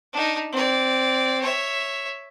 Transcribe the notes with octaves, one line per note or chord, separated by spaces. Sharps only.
D4 D#4
C4 D5
C#5 E5